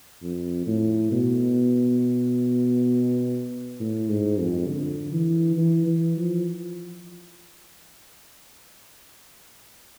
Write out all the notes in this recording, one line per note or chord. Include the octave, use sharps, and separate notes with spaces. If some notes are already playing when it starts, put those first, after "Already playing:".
F2
A2
B2
A2
G#2
F2
D3
E3
E3
E3
F3